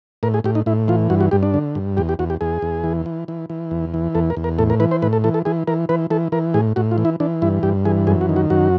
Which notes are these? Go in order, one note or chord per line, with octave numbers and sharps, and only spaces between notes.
A2 A#4
G#4
A2 G4
D#4
A2 E4
E3 F4
G2 F#4
F#4
G2 G4
D4
D3
G2
E2 G4
G4
E2 F#4
G4
E2 G#4
E2
E3
E3
E3
E3
E2
E3
E2 A4
A#4
E2
A#4
A2 A4
A#4
E3 B4
C5
A2 B4
A4
E3 A4
A4
E3 G#4
E3 A#4
E3 B4
E3 A4
E3 A#4
A2 G#4
A2 F#4
F4
E3
E4
E3 D4
G2 E4
G2 G4
E3 G#4
F#2 G#4
F#4
D#3
F#4
F#2 F#4